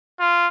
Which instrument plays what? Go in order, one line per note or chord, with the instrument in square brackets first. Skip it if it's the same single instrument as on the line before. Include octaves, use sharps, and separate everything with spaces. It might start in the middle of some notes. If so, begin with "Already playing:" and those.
[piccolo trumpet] F4